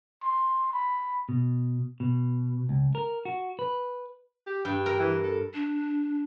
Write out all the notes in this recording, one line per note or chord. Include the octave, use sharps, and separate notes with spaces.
C6
B5
B2
B2
C#2
A#4
F#4
B4
G4
G2 G5
A#4
E3
A4
D4